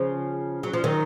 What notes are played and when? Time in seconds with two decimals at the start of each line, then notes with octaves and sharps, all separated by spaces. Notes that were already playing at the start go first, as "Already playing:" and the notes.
Already playing: C#3 F3
0.63 F#3
0.73 F3
0.84 D#3 F#3